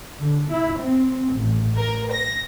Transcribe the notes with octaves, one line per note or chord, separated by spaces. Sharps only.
D3
E4
C4
A1
A#4
A#6